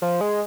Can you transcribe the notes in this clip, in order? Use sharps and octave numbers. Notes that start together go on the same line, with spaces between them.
F3
G#3